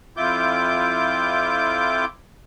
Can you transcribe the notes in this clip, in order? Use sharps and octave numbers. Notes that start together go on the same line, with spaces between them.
F2 E4 F4 D6 G6